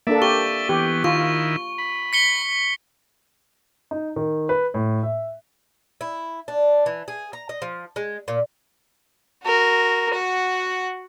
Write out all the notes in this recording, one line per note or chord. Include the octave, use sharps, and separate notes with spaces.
A#3 D4 A4 D5 E5
G4 C#6 G7
E3 B3 G4
D#3 E4 F4 C#6
B5
B6 C#7 G7
D#4
D#3
B4
A2
E5
E4
D4
E3
G#4
A#5
D#5
F3
G#3
A#2
F#4 A#4
F#4 F#5